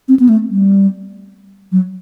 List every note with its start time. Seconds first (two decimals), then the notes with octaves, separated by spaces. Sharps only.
0.08 C4
0.20 B3
0.29 A3
0.50 G3
1.72 F#3